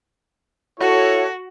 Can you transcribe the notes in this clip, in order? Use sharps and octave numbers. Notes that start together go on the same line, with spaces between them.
E4 F#4 A4 C#5